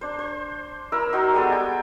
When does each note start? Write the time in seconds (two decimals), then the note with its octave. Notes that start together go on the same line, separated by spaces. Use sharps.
0.01 D4 C5
0.19 C5
0.92 E4 A#4 E6
1.13 D#4 F#4 C5 A#5
1.33 G3 G#3 B3 A4
1.50 G5 G#5